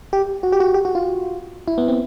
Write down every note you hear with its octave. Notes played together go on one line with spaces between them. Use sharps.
G4
F#4
G4
F#4
G4
F#4
F4
E4
B3
C4